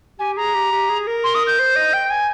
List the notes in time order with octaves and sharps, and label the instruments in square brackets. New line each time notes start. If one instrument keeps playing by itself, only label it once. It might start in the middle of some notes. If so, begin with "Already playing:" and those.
[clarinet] G4 [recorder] G#5
[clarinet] G#4 [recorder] A#5
[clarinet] G4
G4
G#4
A#4
[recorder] C6
D#6
G6
[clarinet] C5
D#5
G5
G#5